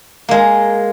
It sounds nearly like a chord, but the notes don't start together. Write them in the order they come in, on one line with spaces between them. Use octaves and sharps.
A#3 G#3 A#4